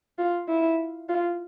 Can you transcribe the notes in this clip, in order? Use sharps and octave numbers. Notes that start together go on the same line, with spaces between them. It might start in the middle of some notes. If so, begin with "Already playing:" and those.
F4
E4
F4